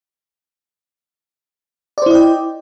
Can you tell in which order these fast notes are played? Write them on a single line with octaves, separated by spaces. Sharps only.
D5 C5 E4 D#5 G5